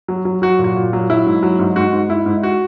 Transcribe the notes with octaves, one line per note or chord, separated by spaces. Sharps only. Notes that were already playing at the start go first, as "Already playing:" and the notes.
F#3
F#3
F#3 F#4
A#2
F#4
A#2
F#3
F#3 E4
G#2
F#3
G#2
G#2 F#4
G#2
G#2 E4
G#2
F#4